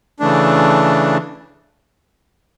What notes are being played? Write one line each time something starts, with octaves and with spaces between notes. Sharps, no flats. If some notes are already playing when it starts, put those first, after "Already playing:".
C#3 E3 A3 D4